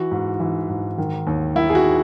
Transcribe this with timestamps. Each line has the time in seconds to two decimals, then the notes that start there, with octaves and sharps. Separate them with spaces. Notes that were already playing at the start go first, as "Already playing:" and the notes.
Already playing: E3 F#4
0.11 G#2
0.40 E3
0.69 G#2
0.98 D#3
1.27 D#2
1.56 D#3 E4
1.70 G#4
1.75 F#4